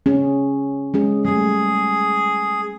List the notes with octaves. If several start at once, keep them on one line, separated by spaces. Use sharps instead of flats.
C#4 G#4
G#3 C#4 G#4
G3 A3 G#4